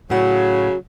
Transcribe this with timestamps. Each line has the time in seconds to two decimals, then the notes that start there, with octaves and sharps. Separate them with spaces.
0.10 A2 C#3 F#3 F#4 F#5